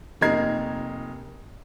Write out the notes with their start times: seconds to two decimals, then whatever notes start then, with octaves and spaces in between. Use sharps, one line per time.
0.21 F1 A#3 D#4 A#5 G#6 C7